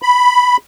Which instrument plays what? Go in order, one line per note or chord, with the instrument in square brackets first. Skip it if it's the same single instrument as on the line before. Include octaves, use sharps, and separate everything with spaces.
[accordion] B5